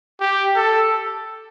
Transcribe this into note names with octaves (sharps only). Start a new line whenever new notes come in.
G4
A4